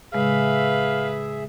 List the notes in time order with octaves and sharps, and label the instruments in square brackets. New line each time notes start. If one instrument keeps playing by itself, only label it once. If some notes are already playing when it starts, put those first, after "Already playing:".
[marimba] A2 C#3 G#3 [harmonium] G#4 E5 [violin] B4 [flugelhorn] F5